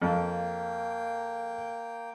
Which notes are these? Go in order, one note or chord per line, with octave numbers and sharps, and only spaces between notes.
F2 A#3 G5